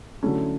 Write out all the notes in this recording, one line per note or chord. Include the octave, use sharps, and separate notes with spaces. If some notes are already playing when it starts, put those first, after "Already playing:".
D3 F#3 A3 C#4 E4